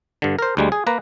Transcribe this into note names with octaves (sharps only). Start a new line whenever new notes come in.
G2 D3
A#4 C5
D2 G3 G#3
G#4
A#3 B4 A#5